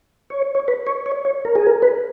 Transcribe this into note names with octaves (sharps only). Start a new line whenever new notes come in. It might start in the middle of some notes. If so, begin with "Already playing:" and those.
C#5
C#5
B4
C#5
C#5
C#5
A#4
G#4
A#4
B4